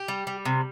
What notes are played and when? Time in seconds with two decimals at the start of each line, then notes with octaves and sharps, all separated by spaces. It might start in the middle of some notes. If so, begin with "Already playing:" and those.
Already playing: G4
0.08 G3
0.27 G3
0.45 C3